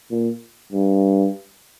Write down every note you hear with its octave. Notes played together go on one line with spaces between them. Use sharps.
A#2
G2